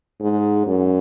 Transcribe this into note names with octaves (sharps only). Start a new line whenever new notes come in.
G#2
F#2